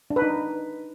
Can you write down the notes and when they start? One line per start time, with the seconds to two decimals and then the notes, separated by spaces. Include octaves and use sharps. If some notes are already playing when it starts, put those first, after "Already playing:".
0.10 D4
0.16 B4
0.22 D#4